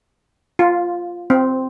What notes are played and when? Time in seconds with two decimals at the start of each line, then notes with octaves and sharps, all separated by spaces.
0.59 F4
1.30 C4